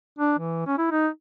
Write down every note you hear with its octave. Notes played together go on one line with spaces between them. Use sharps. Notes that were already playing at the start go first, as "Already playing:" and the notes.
D4
E3
C#4
E4
D#4